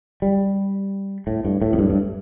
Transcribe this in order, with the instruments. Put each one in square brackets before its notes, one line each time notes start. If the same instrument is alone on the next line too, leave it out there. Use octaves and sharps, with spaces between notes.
[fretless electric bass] G3
A2
G2
A2
F2
G2
G2